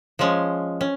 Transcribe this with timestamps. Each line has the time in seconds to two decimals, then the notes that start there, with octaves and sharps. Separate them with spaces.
0.19 F3 G#3 C#4
0.81 C#4